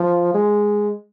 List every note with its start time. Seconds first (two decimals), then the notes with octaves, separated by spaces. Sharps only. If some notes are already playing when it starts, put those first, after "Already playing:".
Already playing: F3
0.34 G#3